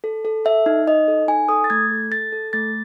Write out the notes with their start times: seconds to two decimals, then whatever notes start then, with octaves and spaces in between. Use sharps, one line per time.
0.04 A4
0.25 A4
0.45 A4 E5
0.66 D#4
0.87 D#4 D#5
1.08 A4
1.28 D#4 G#5
1.49 A4 D#6
1.64 A6
1.70 A3 G#6
1.91 A4
2.11 A4 A6
2.32 A4
2.53 A3 A6